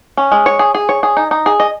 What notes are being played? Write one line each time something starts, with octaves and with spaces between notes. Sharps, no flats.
C#4
G#3
C#5
G#4
G#4
C#5
G#4
D#4
D#4
G#4
D#5